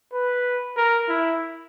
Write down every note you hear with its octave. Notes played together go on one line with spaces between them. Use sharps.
B4
A#4
E4